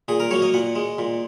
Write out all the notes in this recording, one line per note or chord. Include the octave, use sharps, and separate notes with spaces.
A#2 G#4
A#4
F#3 A#3 C#5
D#5
A#2 F#5
G#3
A#2